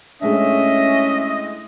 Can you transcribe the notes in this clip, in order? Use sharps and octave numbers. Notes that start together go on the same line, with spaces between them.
A2 G#3 C#4 D4 D#5 E5